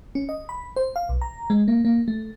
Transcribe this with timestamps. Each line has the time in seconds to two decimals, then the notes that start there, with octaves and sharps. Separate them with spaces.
0.15 C#4
0.29 D#5
0.49 B5
0.76 C5
0.96 F5
1.09 B1
1.22 A#5
1.50 G#3
1.68 A#3
1.85 A#3
2.08 A3